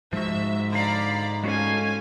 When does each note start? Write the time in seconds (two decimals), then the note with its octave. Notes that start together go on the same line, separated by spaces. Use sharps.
0.13 G#2 F3 F#4 E5
0.72 D3 D5 F5 A#5 B5
1.44 G#3 C#4 F#4 A4 F5 G#5